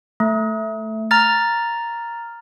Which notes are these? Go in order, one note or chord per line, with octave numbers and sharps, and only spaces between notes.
A3
A#5 F6 A6